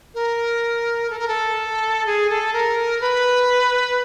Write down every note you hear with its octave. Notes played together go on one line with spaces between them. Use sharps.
A#4
A4
A#4
A4
G#4
A4
A#4
B4